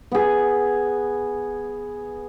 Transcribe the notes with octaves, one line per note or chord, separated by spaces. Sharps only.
B3 G#4